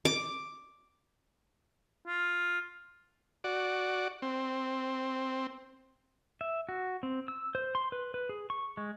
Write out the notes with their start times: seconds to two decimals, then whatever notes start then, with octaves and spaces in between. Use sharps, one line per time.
0.05 D6
2.06 F4
3.44 F#4 D5
4.22 C4
6.41 E5
6.69 F#4
7.03 C4
7.28 E6
7.55 C5
7.75 C6
7.92 B4
8.14 B4
8.29 G#4
8.50 C#6
8.77 G#3